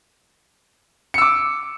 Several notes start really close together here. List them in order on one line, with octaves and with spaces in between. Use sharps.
C#7 E6 D6